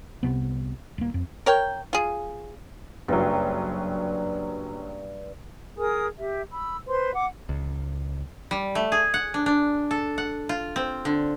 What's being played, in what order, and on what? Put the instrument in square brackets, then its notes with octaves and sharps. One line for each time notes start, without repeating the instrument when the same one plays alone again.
[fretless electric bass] C2 F#2 C3 B3
D#1 A#3
F2
[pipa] A#4 C#5 G5
F4 G#4
[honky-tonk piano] F#1 F#3 [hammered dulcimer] G2
[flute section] G#4 A#4 G#5 D#6
G4 E5
B5 E6
B4 C5 C6
F#5 D6
[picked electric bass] C#2
[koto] G3
A3
G#4
F#5
D4
D4
A4
F#5
F4
C4
D3